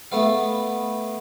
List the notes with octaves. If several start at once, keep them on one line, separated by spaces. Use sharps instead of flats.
A3 B3 F5